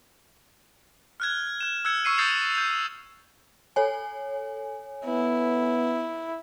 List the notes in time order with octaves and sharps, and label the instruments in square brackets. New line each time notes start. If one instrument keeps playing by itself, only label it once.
[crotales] F6 F#6 G#6
F#6 E7
E6 F#6 G#6 C#7
C#6 E6 C7 C#7 D#7
D#6 G6 A6 C7 C#7 F7
G6 F7
[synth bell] A4 C#5 G#5
[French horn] B3 [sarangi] E4